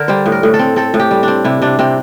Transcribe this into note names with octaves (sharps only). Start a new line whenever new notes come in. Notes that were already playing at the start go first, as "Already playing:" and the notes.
Already playing: D3 A#4
G3 C5
A2
A#4
A2
A4
C4
C4 A4
A2
G4
G3
C4 D4
C3 E4
C3 D4
C3 C4